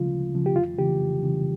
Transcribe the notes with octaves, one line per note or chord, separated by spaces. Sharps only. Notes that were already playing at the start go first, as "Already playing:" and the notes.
Already playing: D2 C#3 F3 F4
D2
C#3 F3
G4
F2 F4
C#3 E3 G4
F2
C#3 E3